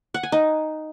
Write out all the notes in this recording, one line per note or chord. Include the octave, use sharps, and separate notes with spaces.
F#5
G#5
D#4